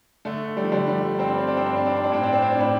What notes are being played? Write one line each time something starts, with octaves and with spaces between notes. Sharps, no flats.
D3 A3
G3
F3
D3 G3
G3
G2 C4
D4
C4
D4
C4
G2 D4
C4
D4
C4
D4
A2 C4
D4
C4
D4
C4
A2 D4